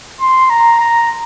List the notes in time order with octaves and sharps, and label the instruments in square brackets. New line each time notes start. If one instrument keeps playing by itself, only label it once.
[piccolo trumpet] C6
A#5
A#5